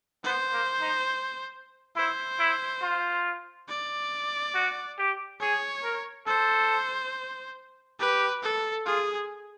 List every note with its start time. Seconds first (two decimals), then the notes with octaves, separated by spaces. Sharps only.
0.24 B3 C5
0.52 A#3
0.81 D#4
1.96 E4 C5
2.39 E4
2.82 F4
3.69 D5
4.55 F#4
4.98 G4
5.41 G#4 C#5
5.84 A#4
6.27 A4 C5
7.99 G4 B4
8.43 A4
8.86 F4 G#4